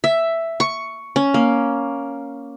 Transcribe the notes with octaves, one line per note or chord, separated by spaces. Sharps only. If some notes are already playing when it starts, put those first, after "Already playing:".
E5
C#6
C#4
A#3